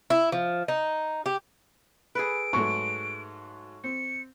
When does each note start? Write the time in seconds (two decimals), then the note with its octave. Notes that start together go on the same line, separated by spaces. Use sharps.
0.10 E4
0.32 F3
0.68 D#4
1.26 G4
2.15 G#4 A4 B4 D7
2.53 G#2 F#3 A3 C#6
3.84 C4 C#7